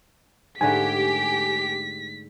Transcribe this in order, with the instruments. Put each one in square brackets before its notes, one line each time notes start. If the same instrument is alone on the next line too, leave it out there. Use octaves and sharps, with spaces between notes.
[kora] G#2 D3 A3 [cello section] G4 [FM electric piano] G#5 [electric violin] B6